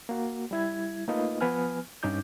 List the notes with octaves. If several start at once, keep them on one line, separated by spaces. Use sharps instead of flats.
A#3 F#4
G3 E4 G#6
A3 A#3 D#4 F4 B4 D#5
F3 B3 B4 G#5 F6
G2 C#4 D#4 D6 G6